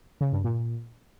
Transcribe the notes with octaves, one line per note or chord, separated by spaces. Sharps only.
C#3
G2
A#2